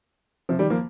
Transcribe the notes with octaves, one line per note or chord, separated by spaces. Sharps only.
C3 F3
D#3 G3
F3 A#3